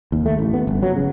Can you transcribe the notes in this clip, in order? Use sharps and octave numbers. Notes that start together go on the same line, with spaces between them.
D#2
A3
A1
B3
G1
F#3
C#3